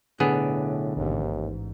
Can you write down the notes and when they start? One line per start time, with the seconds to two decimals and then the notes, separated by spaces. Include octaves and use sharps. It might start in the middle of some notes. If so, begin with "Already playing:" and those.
0.20 B1 A2 D3 B3 G#4
0.96 A1 D#2 G#2